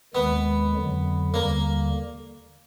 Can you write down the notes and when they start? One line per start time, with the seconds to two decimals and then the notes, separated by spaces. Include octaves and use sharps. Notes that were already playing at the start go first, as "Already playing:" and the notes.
0.14 D#2 D#3 G#3 B3
0.74 F2 D3 F#3
1.34 D#2 D3 G3 A#3